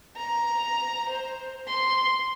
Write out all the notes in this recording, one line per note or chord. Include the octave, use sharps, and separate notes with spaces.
A#5
C5
C6